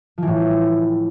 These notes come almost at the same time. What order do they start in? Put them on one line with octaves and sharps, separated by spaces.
F3 E3 A2